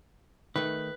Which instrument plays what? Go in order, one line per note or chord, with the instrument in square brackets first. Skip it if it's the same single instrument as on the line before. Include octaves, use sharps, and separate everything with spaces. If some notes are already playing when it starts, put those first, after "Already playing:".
[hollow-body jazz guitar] D#3 A3 [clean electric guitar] B4